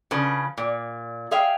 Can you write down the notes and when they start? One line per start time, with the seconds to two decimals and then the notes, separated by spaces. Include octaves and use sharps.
0.11 C#3 F3 B4
0.58 A#2
1.31 G#4 E5 F5 G5